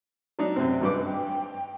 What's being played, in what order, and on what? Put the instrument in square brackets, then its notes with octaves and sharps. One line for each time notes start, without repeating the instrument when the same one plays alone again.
[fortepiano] F#3 D4 D#4
F#2 C3 C4
[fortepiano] G#1 G2 D6 [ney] B4
[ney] G5